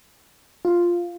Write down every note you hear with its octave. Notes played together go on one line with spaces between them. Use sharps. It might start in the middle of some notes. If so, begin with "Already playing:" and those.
F4